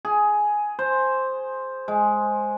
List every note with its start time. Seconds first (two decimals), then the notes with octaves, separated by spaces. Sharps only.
0.05 G#4
0.79 C5
1.88 G#3